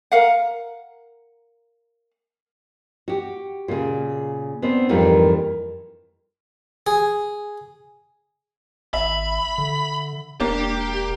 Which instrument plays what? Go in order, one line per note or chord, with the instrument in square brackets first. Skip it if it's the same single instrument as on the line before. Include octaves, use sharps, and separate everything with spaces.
[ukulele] A#4 F5 F#5
[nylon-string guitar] F#4 G4
A#2 C#3
B3 C4 D4
F2 G#2 D#3 E3 G3 A#3
[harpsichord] G#4
[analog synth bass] G#1 [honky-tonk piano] E5 [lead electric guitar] B5
[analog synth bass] D3
[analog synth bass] E1 [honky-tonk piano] A#3 D4 [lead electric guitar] G4